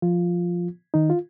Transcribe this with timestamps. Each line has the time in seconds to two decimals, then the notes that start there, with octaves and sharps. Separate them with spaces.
0.02 F3 F4
0.94 D#3 D#4
1.10 F4